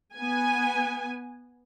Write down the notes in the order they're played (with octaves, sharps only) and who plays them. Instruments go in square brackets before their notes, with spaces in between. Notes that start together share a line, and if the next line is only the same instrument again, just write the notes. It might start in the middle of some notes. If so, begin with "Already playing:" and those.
[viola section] B3 G#5